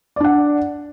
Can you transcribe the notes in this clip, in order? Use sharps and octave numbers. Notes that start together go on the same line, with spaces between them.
D4 D5 F#5